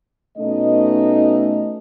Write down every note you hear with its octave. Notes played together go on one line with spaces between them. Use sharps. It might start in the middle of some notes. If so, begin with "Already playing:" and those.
B2 A3 C#4 D#4 D#5